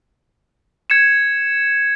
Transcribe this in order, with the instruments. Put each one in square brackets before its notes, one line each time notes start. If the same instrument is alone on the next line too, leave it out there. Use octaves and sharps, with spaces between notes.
[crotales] G#6 C#7 E7